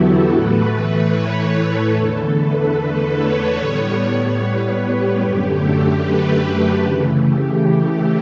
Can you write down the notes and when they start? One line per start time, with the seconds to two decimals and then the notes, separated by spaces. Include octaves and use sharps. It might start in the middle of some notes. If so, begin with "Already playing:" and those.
Already playing: E2 D3 F#3 B3 E4 F#4 G4 A4
0.30 A2 E3 A3 B4
0.71 B4
1.12 C#5
1.53 A4
1.93 E2 D3 A3 A4
2.35 B4
2.75 B4
3.16 C#5
3.58 A2 G3 B3
3.98 C#5
4.38 B4
4.80 G4
5.21 F#2 D3 A3
6.02 B4
6.83 C#3 E3 A3
7.25 G4